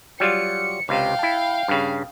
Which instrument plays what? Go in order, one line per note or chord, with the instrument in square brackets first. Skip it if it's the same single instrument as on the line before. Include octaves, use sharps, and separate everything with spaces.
[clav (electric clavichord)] F#3 G3 F4 [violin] C#7
[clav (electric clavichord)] C#2 C3 [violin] F5 G5
[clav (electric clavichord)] E4 A5
G2 C#3